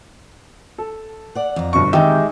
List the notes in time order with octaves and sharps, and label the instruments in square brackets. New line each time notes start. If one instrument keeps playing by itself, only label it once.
[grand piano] A4
[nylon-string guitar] D5 F#5
[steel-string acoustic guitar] F2 A#5
[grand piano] G1 B2 C#6
[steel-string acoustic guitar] D#3 C4 [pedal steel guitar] G#3 G4 E5 [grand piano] D#4 [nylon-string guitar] G5